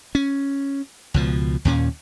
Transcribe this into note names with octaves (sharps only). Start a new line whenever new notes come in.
C#4
C#2 B2 F3
D#2 A#2 C#4